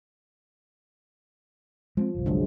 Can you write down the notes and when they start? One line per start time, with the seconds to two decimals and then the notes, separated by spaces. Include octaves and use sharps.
1.97 F3 G#3 A#3 C4
2.14 G1 C2
2.26 D3 F#3 G#3